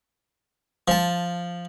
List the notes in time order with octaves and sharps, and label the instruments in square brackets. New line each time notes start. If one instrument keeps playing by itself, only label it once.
[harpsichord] F3 A5